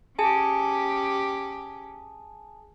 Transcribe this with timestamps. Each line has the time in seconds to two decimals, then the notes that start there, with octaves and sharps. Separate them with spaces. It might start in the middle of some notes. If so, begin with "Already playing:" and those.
0.19 C#4 G4 G#4 G#5 A5